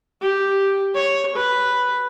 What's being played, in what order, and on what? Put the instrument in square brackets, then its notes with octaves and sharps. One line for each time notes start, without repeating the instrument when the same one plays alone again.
[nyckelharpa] G4
C#5
B4